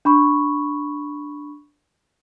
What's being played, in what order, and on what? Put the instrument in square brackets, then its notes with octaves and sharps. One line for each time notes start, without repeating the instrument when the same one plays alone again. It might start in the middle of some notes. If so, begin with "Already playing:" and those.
[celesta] D4 B5 C#6